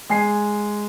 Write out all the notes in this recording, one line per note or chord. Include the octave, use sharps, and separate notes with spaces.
G#3 G#5 C7